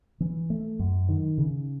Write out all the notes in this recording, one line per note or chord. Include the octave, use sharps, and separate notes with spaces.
E3
A3
F#2
D#3
C#3